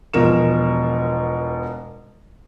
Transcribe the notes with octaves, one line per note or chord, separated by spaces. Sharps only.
E1 B2 F3 A#4 E7